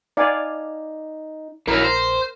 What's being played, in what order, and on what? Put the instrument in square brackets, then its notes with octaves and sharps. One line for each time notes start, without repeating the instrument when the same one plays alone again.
[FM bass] D#4 [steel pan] D5 F5 G#5
[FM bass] A#1 [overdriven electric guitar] E3 F#3 [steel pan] A#4
[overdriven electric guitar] C5